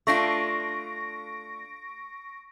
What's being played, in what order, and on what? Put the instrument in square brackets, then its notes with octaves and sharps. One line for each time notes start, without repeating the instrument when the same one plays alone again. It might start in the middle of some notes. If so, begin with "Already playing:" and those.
[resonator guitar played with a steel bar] A3 D4 F4 [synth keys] C#6 A#6 D7